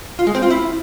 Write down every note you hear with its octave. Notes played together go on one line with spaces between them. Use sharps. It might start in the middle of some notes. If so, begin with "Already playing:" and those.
F4
G#3
C4
F4
E4